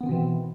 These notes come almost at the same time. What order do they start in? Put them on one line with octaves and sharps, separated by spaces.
B3 D#3 C4 B2 E3